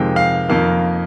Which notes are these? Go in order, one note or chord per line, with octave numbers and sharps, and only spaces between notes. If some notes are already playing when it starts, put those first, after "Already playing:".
Already playing: F2 C3 D#3 G#3 C4 G5
F5
F2 D#3 A#3 F5